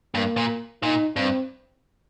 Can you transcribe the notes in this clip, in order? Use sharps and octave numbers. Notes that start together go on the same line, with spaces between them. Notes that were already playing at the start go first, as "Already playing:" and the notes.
G2 A#3
A#2
A#2 D#4
G2 C4